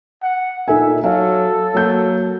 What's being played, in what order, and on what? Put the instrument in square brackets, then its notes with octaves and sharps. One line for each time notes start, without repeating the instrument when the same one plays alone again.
[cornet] F#5
[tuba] A#2 [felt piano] D#4 A4 G#5 [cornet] E5
[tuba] F#3 [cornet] A4 [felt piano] F5
[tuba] F#3 [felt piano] A#3 G6